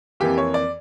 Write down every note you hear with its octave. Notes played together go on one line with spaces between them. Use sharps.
F2 E3 A#3 G4
C#5
D5